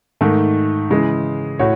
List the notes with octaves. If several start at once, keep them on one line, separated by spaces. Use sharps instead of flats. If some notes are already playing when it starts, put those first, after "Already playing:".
G#2 D#3 A3
C#3 E3 G#3
A2 F#4 C#5